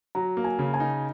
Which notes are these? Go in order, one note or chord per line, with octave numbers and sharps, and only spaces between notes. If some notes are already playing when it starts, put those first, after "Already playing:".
F#3 A#5
A#3
G#5
C#3
G#5
D#4